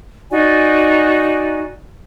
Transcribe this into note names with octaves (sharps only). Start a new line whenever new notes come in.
D#4 F#4 D5 G#5